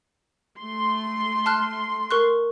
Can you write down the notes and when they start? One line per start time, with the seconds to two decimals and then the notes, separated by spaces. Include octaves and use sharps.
0.58 A3 C6
1.46 A5 F6 F#6
2.11 A#4 C#6 F#6